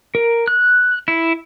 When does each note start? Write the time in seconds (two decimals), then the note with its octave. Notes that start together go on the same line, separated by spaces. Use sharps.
0.15 A#4
0.48 F#6
1.08 E4